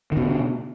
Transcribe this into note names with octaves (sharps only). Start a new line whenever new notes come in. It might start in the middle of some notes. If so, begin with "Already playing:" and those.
B2 D3 D#3